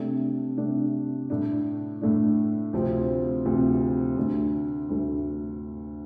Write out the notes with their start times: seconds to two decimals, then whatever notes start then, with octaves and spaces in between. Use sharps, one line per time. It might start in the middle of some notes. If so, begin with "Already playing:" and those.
Already playing: C3 A3 D4
0.57 C3 A3 D4
1.30 A2 A3 D4
2.01 A2 A3 D4
2.73 D2 C3 F3 C4
3.45 D2 C3 F3 C4
4.17 D2 D3 A3
4.89 D2 D3 A3